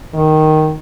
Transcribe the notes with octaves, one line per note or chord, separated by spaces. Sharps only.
D#3